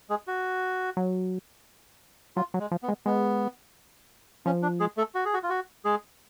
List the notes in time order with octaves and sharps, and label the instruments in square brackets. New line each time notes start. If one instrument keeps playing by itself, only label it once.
[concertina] G#3 G#4
F#4
[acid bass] F#3
[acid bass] F#3 [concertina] F4
[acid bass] F#3
[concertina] G#3
[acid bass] F3
[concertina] B3
[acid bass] G#3
[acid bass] G#3 [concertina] B3
[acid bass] F3 [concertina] C#4
[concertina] D4
G#3 G#4
A3 A4
F#4
G#4
F#4
F4
F#4
G#3 G#4